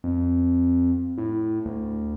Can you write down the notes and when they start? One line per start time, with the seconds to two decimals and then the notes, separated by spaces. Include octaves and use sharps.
0.04 F2
1.18 A2
1.65 D2